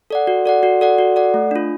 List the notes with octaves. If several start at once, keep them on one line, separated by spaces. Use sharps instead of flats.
A4 D5 F#5
F#4
A4 D5 F#5
F#4
A4 D5 F#5
F#4
A4 D5 F#5
A3
D4 F4